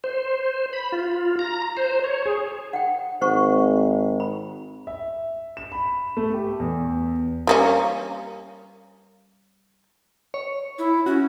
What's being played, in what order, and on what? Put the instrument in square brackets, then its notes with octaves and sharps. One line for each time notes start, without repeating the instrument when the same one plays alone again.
[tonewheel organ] C5
B5
F4
A#5
C5
C#5
G#4
[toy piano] F#5 G5
[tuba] G#1 [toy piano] C5 F#5 C#6
[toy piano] B5
[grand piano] E5
E7
B5
A3
G4
E2
[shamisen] G3 A#3 C#4
[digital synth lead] C#5
[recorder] E4
[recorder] C#4 [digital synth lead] F#4